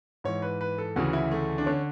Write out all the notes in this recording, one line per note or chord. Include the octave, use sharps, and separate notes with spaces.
G#2 E3 C#5
B4
B4
A4
D2 C#3 E3 F#4
E4
A3
D4
D3 C#4